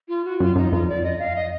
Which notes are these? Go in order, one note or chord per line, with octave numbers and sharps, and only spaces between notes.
F4
F#4
F#2 F4
F#2 D#4
F2 F4
D5
D#5
F5
D#5